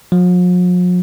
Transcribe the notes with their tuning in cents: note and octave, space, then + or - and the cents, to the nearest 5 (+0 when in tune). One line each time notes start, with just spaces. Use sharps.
F3 +45